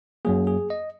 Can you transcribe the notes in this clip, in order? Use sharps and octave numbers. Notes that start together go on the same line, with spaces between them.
F#2 F#3 A#3 G#4
G#4
D#5